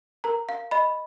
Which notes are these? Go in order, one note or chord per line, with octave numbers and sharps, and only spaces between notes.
A#4 A#5
F5
D#5 B5